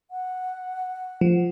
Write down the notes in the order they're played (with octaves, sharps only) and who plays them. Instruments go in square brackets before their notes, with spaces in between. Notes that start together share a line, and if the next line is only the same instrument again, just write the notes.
[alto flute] F#5
[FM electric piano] F3